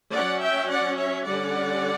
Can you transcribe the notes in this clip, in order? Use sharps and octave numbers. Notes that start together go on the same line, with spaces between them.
F#3 C#4 D5 F#5
E5 G5
D5 F#5
C#5 E5
D3 G3 C#4 D5 F#5